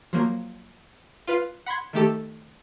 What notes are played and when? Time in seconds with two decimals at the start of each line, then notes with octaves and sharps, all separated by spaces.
0.13 F3 F#3 A#3
1.27 F4 B4 F5
1.66 F#5 B5 C6 G#6
1.93 D#3 A3 G4 A4